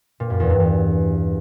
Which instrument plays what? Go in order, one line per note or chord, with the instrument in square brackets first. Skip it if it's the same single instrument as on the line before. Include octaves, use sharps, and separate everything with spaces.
[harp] A#2
F#2
E2
G2
E2